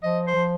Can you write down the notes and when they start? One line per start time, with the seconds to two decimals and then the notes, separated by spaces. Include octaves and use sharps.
0.03 F3 D#5
0.27 C5
0.35 F3